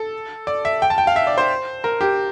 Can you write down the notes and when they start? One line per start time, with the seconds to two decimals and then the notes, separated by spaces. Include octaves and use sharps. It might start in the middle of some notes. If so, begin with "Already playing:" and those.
Already playing: A4
0.47 D5
0.65 E5
0.82 G5
0.90 A5
0.98 G5
1.07 F5
1.16 E5
1.27 D5
1.38 C5
1.84 A#4
2.01 G4